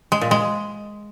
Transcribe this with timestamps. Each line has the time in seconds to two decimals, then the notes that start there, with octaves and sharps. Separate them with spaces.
0.12 G#3
0.21 A#2
0.31 G#3